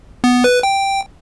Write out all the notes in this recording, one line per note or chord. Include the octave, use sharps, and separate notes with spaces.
B3
B4
G5